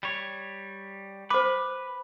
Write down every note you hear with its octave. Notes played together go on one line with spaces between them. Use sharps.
G3 C#5
B4 C5 B5 D6